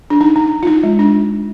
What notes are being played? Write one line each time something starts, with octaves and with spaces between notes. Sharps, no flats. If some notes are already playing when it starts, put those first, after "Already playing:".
D4
D#4
D#4
F4
D#4
G#3
D4